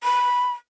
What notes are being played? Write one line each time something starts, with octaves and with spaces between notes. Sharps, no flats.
B5